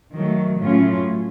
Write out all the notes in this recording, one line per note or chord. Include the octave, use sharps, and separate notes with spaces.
D#3 F#3 A3
A2 F#3 A3 C#4 F4